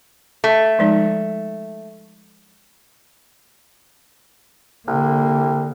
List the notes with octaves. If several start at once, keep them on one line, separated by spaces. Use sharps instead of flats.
A3
F3 G#3 D#4
C2 D3 A#3